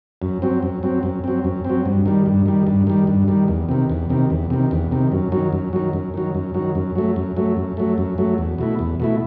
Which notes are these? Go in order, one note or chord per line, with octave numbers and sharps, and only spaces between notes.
F#2
F#3 C4
F#2
F#3 C4
F#2
F#3 C4
F#2
C4
F#3
G2
D#3 G3
G2
D#3 G3
G2
D#3 G3
G2
D#3 G3
E2
C3 D#3
E2
C3 D#3
E2
C3 D#3
E2
C3 D#3
F#2
D#3 F#3
F#2
D#3 F#3
F#2
D#3 F#3
F#2
D#3 F#3
F#2
F#3 A3
F#2
F#3 A3
F#2
F#3 A3
F#2
F#3 A3
E2
B2 A3 E4
E2
B2 A3 E4